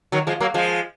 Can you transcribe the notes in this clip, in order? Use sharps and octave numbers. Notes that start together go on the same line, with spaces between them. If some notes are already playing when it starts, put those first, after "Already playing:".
D#3 F#3
F3 G#3
F#3 A#3
F3 G#3